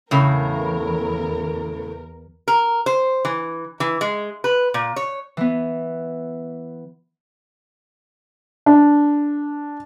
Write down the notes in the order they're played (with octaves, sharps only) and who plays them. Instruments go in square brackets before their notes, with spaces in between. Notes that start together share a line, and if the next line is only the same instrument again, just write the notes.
[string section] E2 A#4 [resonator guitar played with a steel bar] A2 C#3
[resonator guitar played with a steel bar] A#4
C5
E3
E3
G#3
B4
A#2
C#5
[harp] E3 B3
[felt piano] D4